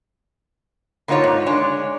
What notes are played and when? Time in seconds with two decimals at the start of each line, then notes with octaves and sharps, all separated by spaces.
1.08 D3 A#3 D#4 F4 C#5
1.24 G#2
1.46 G#3 D4 C#5